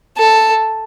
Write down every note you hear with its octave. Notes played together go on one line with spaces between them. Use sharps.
A4